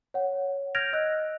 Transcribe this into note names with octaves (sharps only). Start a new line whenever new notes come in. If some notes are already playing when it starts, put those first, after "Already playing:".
C#5 F#5
F6 G6 G#6 A#6 D7 F7
D#5 E6 F#6